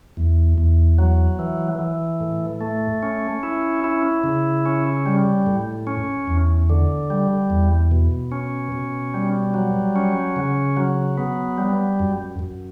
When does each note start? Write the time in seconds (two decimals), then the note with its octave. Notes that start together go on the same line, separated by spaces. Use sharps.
0.17 E2
0.58 E2
0.99 F#3
1.39 E3
1.79 E3
2.20 A2
2.61 A3
3.03 C#4
3.43 E4
3.84 E4
4.24 C#3
4.66 C#4
5.06 G3
5.46 A2
5.87 C#4
6.28 E2
6.70 D3
7.10 G3
7.50 E2
7.91 B2
8.32 C#4
8.72 B2
9.14 G3
9.54 F#3
9.96 C#4
10.36 C#3
10.77 F#3
11.18 B3
11.58 G3
11.99 F#2
12.39 F#2